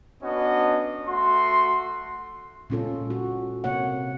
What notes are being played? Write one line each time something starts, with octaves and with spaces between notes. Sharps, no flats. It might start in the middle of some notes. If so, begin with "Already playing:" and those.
B3 C#4 D4 F#4 D#5
A3 F#4 C6
A#2 G#3 C#4 F4 A4
F#4
C3 A#3 C#5 F#5